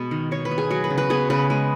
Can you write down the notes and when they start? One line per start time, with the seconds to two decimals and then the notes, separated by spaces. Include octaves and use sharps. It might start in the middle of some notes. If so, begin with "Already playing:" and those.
Already playing: B2 G#3 B3
0.11 D#3
0.31 D#3 C#5
0.45 B4
0.51 B3
0.58 G#4
0.70 F#3 F#4
0.84 B4
0.90 C#3
0.98 B4
1.10 B3 G#4
1.30 C#3 B4
1.50 G#3